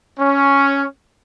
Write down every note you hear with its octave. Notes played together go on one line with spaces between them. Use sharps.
C#4